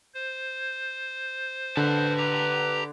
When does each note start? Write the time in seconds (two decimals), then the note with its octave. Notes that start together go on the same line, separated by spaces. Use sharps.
0.14 C5
1.77 D3 B4 A5
2.17 G4 A#5